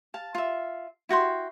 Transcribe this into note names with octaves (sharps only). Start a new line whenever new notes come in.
F5 A5
F4 E5
E4 F#4 G5 C6